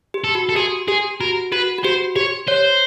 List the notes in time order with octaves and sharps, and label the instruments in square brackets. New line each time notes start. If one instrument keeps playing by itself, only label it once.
[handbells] G4
[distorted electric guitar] A4
[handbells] F#4
[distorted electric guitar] A4
[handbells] G4 [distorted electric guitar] G#4
[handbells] G4 [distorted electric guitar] G#4
[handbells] F#4 [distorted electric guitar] A#4
[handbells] F#4 [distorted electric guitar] B4
[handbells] F#4
[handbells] G4 [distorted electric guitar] C5
[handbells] G4 [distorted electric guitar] C#5
[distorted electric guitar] C5 [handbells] C#5